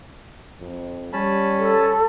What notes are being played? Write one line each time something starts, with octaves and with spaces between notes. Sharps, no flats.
F2
G3 C#4 A5 B5
A4